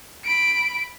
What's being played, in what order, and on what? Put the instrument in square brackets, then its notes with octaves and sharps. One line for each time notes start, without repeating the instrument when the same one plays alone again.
[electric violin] B5 D7